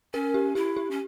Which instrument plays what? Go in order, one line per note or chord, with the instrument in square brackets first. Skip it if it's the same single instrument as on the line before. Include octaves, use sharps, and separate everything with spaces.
[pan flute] C#4 [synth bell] A#4
[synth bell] G4
[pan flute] E4 [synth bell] G4
[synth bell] G4
[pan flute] C#4